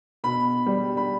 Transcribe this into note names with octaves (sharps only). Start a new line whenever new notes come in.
B2 B5
G3
B5